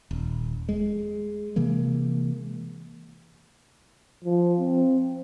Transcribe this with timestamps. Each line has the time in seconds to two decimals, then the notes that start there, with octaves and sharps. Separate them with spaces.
0.11 D#1
0.69 G#3
1.56 C3 E3 G#3 A#3
4.24 F3
4.60 C4